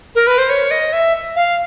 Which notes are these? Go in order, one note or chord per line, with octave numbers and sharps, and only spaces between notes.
A#4
B4
C5
C#5
D#5
E5
F5